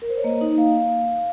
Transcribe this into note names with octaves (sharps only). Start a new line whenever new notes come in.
A#4
C5
C#5
A#3 D#5
D#4
A#3 F5